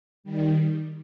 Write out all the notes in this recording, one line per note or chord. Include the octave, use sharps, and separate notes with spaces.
D#3 G3